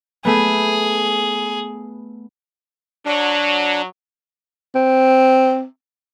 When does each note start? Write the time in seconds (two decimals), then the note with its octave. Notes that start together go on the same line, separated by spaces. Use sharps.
0.25 A3 B3 G#4
3.05 F#3 D4
4.75 C4